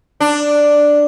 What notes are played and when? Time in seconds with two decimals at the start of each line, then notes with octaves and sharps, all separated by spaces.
0.20 D4